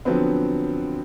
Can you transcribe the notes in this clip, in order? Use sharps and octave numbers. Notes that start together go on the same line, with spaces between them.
D3 F3 F#3 B3 C4